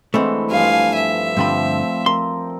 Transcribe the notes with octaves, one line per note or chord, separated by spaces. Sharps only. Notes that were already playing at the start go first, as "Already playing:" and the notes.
D3 E3 G#3 A3 C4
G2 F3 F5 G#5
E5
G2 D3 F3 A3 C4 B5
A#4 C6